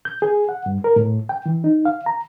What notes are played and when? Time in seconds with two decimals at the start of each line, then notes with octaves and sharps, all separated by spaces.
0.05 G6
0.22 G#4
0.49 F#5
0.66 G2
0.84 A#4
0.96 A2
1.29 G5
1.46 E3
1.64 D#4
1.85 F5
2.06 A#5